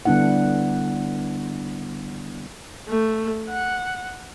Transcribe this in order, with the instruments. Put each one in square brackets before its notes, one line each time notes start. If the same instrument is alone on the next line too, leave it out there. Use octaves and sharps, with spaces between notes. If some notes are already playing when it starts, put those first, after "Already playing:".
[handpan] D3 G3 B3 D4 E4 F#5
[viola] A3
F#5